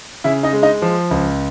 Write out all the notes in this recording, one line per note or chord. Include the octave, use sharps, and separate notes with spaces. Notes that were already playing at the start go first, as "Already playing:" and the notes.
C#3 E4 E5
D#4 D#5
G#3
D#4 D#5
F3
C#2